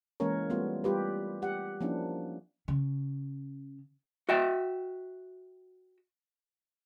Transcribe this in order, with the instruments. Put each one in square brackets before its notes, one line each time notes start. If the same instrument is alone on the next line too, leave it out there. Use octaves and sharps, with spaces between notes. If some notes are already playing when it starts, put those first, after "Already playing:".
[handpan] E3 G#3 A#3 C#4 A#4 C#5
G3 A3 B3 F4
G3 F4 G4 B4
G4 F#5
F3 A#3 C#4 D4 E4
[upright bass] C#3
[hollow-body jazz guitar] F#4 D#5 E5 G5